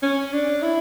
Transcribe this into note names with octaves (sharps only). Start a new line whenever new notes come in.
C#4
D4
E4